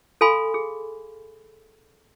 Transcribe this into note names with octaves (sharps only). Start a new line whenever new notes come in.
A4 F5 G#5 B5 C6
G#4